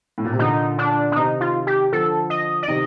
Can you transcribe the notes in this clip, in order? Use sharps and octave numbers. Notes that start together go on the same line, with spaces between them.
A2
A#2
C3
A#2 D3 D#4
D4
D4
C3 D#3 D#4
F4
G4
D3 F3 A4
D#5
D5
C3 D#3 D#5